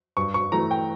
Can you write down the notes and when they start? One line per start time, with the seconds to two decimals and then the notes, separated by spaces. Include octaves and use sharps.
0.17 G2 C#6
0.34 C#6
0.52 E3 A3 A#5
0.71 G5